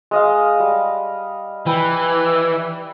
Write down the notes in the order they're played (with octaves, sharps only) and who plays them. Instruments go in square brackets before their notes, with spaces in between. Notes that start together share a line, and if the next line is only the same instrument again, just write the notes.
[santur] G#3 D#5 F5
G3
[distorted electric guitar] E3 [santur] G5 B5